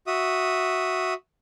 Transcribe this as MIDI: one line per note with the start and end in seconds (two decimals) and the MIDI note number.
0.07 1.14 66
0.07 1.14 76
0.07 1.14 87